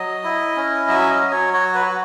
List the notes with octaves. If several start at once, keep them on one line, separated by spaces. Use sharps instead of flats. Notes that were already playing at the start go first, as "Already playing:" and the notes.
Already playing: F#3 D#5
E4
C#4
F#3 E5
D#5
F#3
C#5
F#4 C#5
B4
F#4